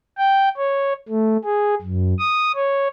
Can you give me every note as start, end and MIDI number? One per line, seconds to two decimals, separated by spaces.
0.18 0.49 79
0.57 0.93 73
1.09 1.37 57
1.44 1.74 68
1.82 2.14 42
2.18 2.52 87
2.55 2.88 73